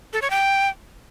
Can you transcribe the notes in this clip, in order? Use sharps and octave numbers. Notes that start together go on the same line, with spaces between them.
A4
C#5
G5